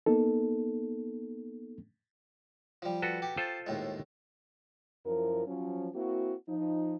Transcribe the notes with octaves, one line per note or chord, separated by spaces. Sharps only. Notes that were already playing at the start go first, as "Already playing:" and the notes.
A#3 B3 D#4 A4
F3 G3
F#4 A4 B4
G4
F4 A4 C5
D#2 A2 G#3
F#2 F3 E4 A#4
F3 F#3 C#4
A#3 C4 E4 F#4
F3 D#4